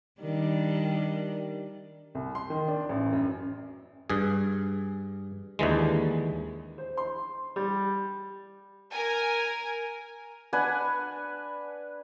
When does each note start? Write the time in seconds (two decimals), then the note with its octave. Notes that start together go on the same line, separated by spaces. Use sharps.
0.20 D#3 G3 D4
2.15 C2
2.35 C6
2.50 D#3
2.68 D4
2.89 A1
3.13 F#2
4.10 G2 G#4
5.59 D#2 D3 E3 G#3
6.78 C5
6.97 C6
7.56 G3
8.93 A#4 G#5
10.53 D4 B4 F#5 G#5